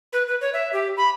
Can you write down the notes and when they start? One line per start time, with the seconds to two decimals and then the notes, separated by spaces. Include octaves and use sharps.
0.13 B4
0.28 B4
0.41 C#5
0.53 E5
0.73 G4
0.97 B5